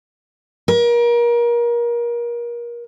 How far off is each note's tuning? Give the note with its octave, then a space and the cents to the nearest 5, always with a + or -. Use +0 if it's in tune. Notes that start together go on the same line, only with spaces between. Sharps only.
A#4 +30